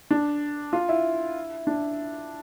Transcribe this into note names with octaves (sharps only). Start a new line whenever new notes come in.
D4
F4
E4
D4